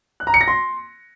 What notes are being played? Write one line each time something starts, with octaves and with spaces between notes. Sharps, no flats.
F#6
A#5
C#7
A#6
C6